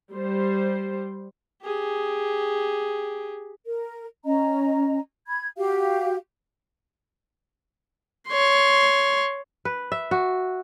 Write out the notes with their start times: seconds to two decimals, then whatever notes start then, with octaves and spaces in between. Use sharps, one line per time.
0.13 G3 C5
1.62 G4 G#4
3.66 A#4
4.25 C#4 D#5 A#5
5.28 B5 G#6
5.57 F#4 G4 F5
8.29 C#5 C6
9.65 B4
9.92 E5
10.11 F#4